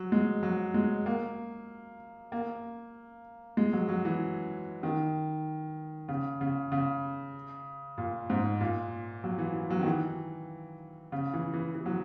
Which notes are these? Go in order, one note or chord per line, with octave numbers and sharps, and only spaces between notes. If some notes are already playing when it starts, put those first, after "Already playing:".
Already playing: F#3
G#3
F#3
G#3
A#3
A#3
G#3
F#3
F#3
E3
D#3
C#3
C#3
C#3
A#2
G#2
A#2
F#3
E3
E3
F#3
D#3
E3
C#3
E3
E3
E3
F#3